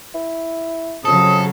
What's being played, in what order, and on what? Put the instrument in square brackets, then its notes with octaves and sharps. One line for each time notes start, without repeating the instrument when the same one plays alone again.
[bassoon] E4
[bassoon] F2 [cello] C#3 F#3 [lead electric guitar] A4 [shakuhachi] D#6